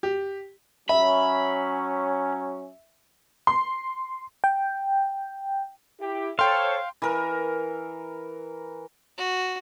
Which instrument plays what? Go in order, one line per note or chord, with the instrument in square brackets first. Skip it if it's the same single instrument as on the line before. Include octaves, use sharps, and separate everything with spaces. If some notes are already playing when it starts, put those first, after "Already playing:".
[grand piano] G4
[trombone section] F#3 C#4 [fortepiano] E5 [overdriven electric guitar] B5
[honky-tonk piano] C6
[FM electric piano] G5
[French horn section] E4 G4
[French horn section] A4 C5 C#5 [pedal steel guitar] F5 [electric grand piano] G5 C6
[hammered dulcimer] E3 A#4
[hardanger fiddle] F#4